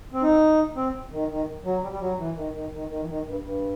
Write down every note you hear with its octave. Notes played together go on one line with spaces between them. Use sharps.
C4
D#4
C4
D#3
D#3
F#3
G3
G3
F#3
E3
D#3
D#3
D#3
D#3
E3
D#3
G2
G2